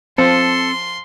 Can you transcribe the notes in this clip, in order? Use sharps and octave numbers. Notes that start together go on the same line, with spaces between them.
F3 C4 A4 C6